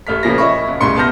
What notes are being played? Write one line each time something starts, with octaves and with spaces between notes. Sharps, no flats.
A1 A3 F6 B6
A#2 C#3 F3 A#3 A#6
C#5 D#5 E5 B5 C#6
F#1
C2 A2 C#3 C6 C#7
B3 A5 F6 G6 A#6